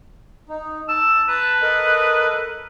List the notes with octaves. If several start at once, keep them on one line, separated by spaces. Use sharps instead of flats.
D#4
A5 E6
B4 A5 A#5
A4 A#4 D#5